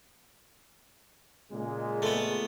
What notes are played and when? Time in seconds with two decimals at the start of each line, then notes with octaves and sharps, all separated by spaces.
1.52 A#2 C#3 G#3
2.02 A3 B3